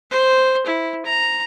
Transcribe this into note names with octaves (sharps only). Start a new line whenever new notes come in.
C5
E4
A#5